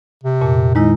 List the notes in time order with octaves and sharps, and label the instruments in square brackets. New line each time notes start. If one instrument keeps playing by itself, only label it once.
[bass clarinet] C3
[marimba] F2 A#2
[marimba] D#3 G#3 E4 [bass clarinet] D#4